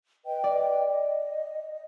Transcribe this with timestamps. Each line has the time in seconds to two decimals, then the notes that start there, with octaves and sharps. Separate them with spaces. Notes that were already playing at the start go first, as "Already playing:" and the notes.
0.25 B4 D#5 G5
0.44 D5
0.87 D#5